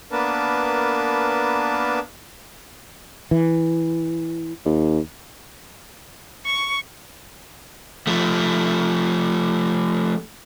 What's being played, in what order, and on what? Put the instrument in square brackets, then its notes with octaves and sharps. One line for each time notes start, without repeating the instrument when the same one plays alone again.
[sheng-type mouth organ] A#3 B3 D4 A#4 B4 A5
[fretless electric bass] E3
[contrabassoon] D#2
[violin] C#6
[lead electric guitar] F3 A3